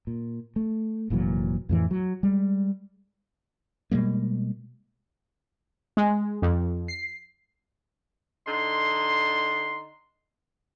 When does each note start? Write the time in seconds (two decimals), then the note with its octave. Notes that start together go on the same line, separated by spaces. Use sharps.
0.07 A#2
0.56 A3
1.10 F1 A#2 E3 F#3
1.69 F2 A2 E3
1.91 F#3
2.23 G3 G#3
3.91 B2 G3 G#3 A#3
5.97 G#3
6.42 F2
6.88 C7
8.47 D3 D#4 C6